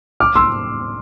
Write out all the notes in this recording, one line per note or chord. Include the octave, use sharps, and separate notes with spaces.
D6 F6
C6 E6